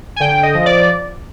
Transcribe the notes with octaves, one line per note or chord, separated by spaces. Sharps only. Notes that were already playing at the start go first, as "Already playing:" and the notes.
G#5
D3 G5
D#5
F3
D5